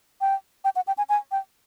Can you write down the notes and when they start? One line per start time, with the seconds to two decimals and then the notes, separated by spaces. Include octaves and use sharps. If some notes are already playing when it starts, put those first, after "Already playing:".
0.21 G5
0.64 G5
0.76 F#5
0.87 G5
0.98 G#5
1.09 G#5
1.31 G5